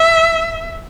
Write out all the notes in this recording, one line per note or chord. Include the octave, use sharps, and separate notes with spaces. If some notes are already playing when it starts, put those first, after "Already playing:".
Already playing: E5